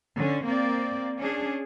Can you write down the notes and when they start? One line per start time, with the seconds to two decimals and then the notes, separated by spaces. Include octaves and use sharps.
0.16 D3 C#4
0.45 A#3 C4 D5
1.18 C#4 D4 G#4